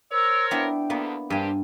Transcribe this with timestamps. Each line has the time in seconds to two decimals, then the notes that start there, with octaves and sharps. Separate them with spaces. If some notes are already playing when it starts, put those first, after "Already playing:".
0.12 A#4 C5 C#5 E6
0.51 B3 D4 E4 G5
0.90 D2 A#3 B3
1.30 G2 C4 D4 G4 A#4 G#5